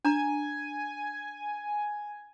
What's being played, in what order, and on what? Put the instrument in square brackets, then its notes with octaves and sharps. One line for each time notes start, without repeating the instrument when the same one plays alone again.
[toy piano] D4 A#5 [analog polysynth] G#5